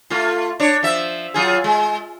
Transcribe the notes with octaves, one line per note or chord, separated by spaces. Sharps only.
A3 F4
D4 C#5
F3 E5
F#3 F4 G#4
G#3